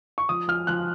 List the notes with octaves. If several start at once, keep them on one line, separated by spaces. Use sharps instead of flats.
C#6
F3 D#6
F3 F6
F3 F#6